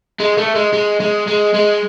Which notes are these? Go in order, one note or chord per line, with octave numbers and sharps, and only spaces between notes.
G#3
A3
G#3
G#3
G#3
G#3
G#3